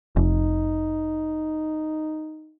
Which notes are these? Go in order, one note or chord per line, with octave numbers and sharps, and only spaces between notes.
F1 D#4